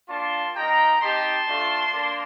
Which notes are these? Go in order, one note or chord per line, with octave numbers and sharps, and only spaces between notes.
A#3 D4 F4 A5 C6
A#3 D#4 G4 G5 A#5
C4 D#4 G4 A5 C6
A3 D4 F4
A#3 D4